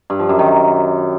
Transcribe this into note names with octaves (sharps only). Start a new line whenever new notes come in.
G2
F3
F#2
D#3